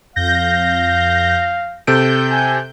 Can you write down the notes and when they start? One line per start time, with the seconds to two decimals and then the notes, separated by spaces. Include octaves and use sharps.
0.16 F2 F5 G6 A#6
1.87 C3 A4 G6 D7
2.32 G#5